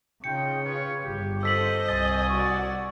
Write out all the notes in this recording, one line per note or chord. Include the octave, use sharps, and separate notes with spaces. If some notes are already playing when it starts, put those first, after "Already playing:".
C#3 D#4 F4 G5 C#7
F4 B4 C#5
G1 G4
C4 F4 A4 C5 D#5 E6 B6 F#7
C2 G#5 D#6 A6
F#4 D5 C#6